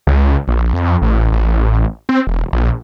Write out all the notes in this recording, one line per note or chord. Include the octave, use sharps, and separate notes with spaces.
C#2
A#1
F2
A1
A1
C4
E1
A#1